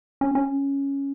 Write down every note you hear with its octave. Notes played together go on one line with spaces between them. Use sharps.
C#4
C#4